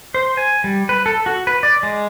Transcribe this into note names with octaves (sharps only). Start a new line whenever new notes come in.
C5
G#5
G3
B4
A4
F#4
B4
D5
G#3